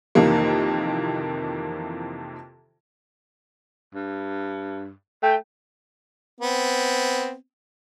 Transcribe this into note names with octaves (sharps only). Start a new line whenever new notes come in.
F2 C3 D#3 E3 A#3
G2
A3 G5
B3 C4